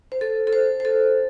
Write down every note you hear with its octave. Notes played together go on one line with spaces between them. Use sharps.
C5
A4
A4
C5
C5
A4